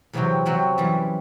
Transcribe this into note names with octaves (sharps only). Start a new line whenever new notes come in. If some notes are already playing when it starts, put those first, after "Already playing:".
E2 C3 F#3 C4 F#4
C3 F#3 C4 F#4
F#2 E3 G3